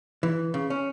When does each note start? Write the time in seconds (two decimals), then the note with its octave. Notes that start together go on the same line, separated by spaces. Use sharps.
0.23 E3
0.54 C#3
0.70 C#4